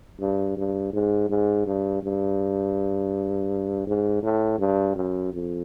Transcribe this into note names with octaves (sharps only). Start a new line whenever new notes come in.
G2
G2
G#2
G#2
G2
G2
G#2
A2
G2
F#2
F2